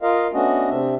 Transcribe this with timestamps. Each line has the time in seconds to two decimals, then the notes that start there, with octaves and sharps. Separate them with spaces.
0.02 F4 A#4 D#5 F5
0.33 A3 B3 C#4 D4 F#4 D#5
0.69 C3 C4 D4 E5